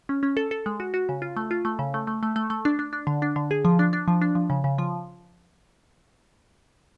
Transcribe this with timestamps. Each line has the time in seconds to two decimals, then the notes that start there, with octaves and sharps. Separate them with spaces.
0.09 C#4
0.23 C#4
0.37 A4
0.51 A4
0.66 G#3
0.80 F#4
0.94 F#4
1.09 C#3
1.22 F4
1.37 A3
1.51 F4
1.65 A3
1.79 C#3
1.94 A3
2.07 A3
2.23 A3
2.36 A3
2.50 A3
2.65 D4
2.79 D4
2.93 D4
3.07 D3
3.22 D4
3.36 D3
3.51 G#4
3.65 F3
3.79 D4
3.93 D4
4.08 F3
4.22 D4
4.35 F3
4.50 C#3
4.64 C#3
4.78 F3